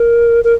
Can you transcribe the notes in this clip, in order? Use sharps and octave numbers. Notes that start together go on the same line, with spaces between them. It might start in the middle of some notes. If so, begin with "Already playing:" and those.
Already playing: A#4
A#4